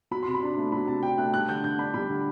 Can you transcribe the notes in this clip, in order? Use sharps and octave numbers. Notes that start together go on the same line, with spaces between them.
F#3 B5
C3 C6
B5
D4
A3
F#3 B5
C3 A5
D4 G5
A3 F#6
G3 F#6
D3 G6
D3 G6
D4 B5
G3 B5
D3